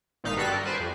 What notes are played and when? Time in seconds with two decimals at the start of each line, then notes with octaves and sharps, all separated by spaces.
0.24 G#1 A#2 D#4 F5 B6
0.37 G2 G3 F#4 A4 F#6 B6
0.52 A#4
0.65 B4 C5 D5 G#5
0.80 F2